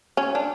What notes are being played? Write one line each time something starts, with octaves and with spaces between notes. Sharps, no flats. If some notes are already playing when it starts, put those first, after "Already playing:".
C#4
D4